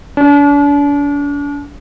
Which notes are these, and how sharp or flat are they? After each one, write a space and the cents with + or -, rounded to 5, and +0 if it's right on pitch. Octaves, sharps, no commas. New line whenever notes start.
D4 -40